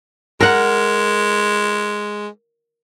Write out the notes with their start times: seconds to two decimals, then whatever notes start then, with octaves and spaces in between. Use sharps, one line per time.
0.41 G#3 A#4 F#5